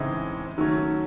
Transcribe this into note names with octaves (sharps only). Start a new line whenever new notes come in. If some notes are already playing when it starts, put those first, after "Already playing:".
Already playing: A2 C#3 E3 G#3 C4 D#4
D#3 F#3 A3 C#4